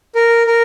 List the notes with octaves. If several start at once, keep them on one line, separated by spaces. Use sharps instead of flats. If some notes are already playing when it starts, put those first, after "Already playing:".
A#4
A#4